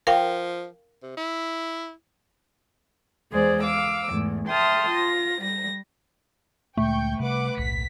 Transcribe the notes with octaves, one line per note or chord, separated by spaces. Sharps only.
F3 A#4 F5 G5
C3
E4
E2 G#3 G#4 C5 D5
F5 D6 E6
E2 G#2 A3
E5 G5 A5 C6 D#6 F6
F4 A#6
G3 A#6
D2 A#2 G#3 A3 G5 C#6 G6
C3 G3 B4 F#5 D6
D#1 B1 A2 B6